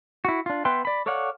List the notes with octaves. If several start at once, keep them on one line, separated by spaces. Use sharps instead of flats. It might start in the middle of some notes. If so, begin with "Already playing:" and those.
E4 F#4
D4 F4
B3 B4 E5 G5 C6
D5 B5
A4 C#5 D5 F5 F#5